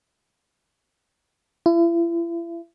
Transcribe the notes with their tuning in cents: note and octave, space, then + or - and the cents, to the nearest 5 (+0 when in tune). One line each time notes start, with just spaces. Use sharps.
E4 +40